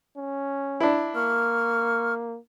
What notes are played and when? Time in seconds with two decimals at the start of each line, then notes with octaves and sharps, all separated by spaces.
0.17 C#4
0.80 D4 E4
1.16 A#3 C#6 F6